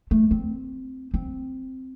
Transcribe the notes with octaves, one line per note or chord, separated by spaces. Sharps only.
A3
C4
C4